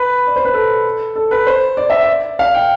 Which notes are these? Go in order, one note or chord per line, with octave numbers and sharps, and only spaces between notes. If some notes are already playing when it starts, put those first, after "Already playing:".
Already playing: B4
D5
C5
B4
A4
A4
B4
C5
D5
E5
D5
F5
G5